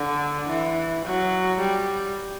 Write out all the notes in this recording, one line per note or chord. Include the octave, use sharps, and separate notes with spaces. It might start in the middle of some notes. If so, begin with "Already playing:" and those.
Already playing: D3
E3
F#3
G3